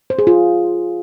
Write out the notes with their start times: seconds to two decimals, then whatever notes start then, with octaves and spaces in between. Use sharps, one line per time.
0.10 C5
0.19 G#4
0.27 F4